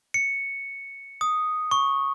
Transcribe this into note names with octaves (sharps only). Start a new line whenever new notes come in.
C#7
D#6
C#6